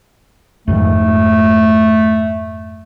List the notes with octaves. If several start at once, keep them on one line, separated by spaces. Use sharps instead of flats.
F2 G#2 D#3 A3